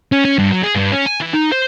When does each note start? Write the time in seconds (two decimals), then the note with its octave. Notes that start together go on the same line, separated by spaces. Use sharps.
0.12 C#4
0.25 C#4
0.38 G2
0.51 F#3
0.63 G#4
0.75 G2
0.91 C#4
1.06 G#5
1.20 E3
1.33 D#4
1.52 C5